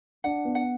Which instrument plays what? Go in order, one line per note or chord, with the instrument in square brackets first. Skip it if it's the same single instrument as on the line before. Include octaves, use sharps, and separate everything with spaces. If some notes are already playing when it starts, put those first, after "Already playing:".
[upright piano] D4 [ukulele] F#5
[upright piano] B3
[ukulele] F#5